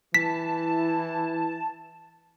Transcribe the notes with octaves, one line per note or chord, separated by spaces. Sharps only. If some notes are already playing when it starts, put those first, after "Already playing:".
E3 E4 A5 B6